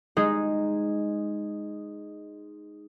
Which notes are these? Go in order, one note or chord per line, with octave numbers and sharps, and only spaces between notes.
G#3 D#4 G#4